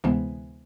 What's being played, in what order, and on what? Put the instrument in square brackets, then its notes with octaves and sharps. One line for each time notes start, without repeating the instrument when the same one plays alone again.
[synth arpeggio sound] D2 C3 E3 G#3 B3